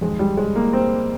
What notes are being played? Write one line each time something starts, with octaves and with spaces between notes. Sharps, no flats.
F2 D#3 G#3
G3
G#3
A#3
C4